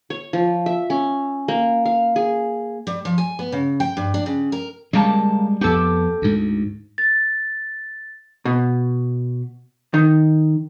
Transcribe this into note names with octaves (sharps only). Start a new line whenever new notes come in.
C#5
F3
E5
C#4
A#3
F5
G#4
G3
F3
G#5
B3
C#3
G5
G2
D4
C#3
A#4
C#3 G3 G#3 A#3 A5
F2 B3 G4 A4
D2 G#2
A6
B2
D#3